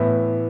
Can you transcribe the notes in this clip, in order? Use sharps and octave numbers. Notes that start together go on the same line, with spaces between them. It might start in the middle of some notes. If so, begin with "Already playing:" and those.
Already playing: A2 E3 B3 E5